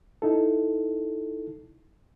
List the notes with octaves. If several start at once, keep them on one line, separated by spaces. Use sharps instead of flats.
D#4 E4 A4